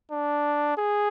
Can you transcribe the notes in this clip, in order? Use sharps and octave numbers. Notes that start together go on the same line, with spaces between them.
D4
G#4